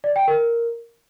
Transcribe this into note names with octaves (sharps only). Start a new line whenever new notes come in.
D5
G5
A#4